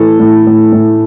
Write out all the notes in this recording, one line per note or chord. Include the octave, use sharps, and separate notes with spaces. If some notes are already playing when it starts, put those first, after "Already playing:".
Already playing: A2 E3 A4
A2
A2
A2